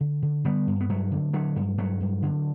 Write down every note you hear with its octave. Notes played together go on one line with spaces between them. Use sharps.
D3
D3
D3 G3 B3
G2
B3
G2 F#3 A3
D3
D3 F#3 A3
G2
G2 F#3 A3
G2
D3